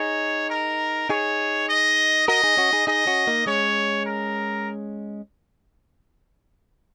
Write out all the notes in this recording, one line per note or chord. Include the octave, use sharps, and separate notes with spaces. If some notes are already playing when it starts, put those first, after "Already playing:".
Already playing: D#4 G#4 C#5
A#4
D#4 G#4 C#5
D#5
F#4 A#4 D#5
D#4 G#4
C#4 F#4
D#4 G#4
D#4 G#4 D#5
C#4 F#4
A#3 D#4
G#3 C#4 C#5
A#4